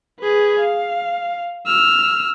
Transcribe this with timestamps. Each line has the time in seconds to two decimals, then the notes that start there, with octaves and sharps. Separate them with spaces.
0.20 G#4 B4
0.60 F5
1.66 E6 F6